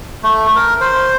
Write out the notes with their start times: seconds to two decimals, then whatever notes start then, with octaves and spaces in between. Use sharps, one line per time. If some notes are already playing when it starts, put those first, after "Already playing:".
0.23 A3
0.56 A#4
0.81 C5